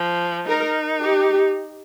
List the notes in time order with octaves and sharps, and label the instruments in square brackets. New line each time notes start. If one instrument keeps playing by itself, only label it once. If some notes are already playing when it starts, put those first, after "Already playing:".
Already playing: [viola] F3
[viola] D#4 [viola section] A#4
[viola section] G4